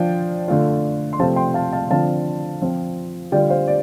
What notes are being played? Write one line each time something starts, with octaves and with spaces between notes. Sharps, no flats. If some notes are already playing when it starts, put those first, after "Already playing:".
Already playing: F3 D4 F4 G5
D3 A3 F4
C6
C3 F3 A3 C4 F5 A5
G5 C6
F5 A5
F5 A5
D3 F3 C4 F4 F5 A5
F3 C4 F4
D3 G3 D4 F4 D5 G5
C5 F5
D5